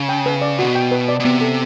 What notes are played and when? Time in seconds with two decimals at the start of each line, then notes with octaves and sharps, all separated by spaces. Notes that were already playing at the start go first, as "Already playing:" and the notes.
Already playing: C#3
0.09 G5
0.26 B4
0.41 D5
0.59 B2 F#4
0.75 G5
0.92 B4
1.08 D5
1.20 B2
1.25 C3 B3
1.41 A4